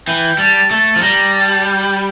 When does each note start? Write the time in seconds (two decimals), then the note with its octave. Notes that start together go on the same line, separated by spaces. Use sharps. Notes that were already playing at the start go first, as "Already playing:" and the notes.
0.07 E3 G5
0.38 G3 A5
0.70 A3 A5
0.96 F3
1.02 G3 A#5
1.34 A5
1.65 G5